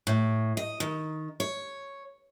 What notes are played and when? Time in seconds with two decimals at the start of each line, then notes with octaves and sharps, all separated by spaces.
0.07 A2
0.57 D#5
0.80 D#3
1.40 C#5